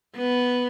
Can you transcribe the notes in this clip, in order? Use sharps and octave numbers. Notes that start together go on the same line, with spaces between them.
B3